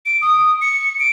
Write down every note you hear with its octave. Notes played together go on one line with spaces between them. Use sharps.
D7
D#6
C#7
D7